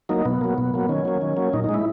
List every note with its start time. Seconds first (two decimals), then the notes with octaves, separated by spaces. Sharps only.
0.09 F#3 A#3 D#4
0.25 B2 B3
0.41 F#3 A#3
0.58 B2
0.74 F#3 A#3
0.89 D#3 C#4
1.05 F#3 A#3
1.21 D#3
1.37 F#3 A#3
1.53 A#2 D#4
1.64 G#3 D#4
1.74 E4